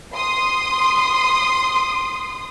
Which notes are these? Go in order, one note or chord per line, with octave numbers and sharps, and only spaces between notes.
C6 D#6